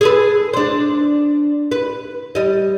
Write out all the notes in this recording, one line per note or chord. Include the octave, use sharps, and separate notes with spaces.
G#4 A4 B4
D4 C5
B4
G3 D#5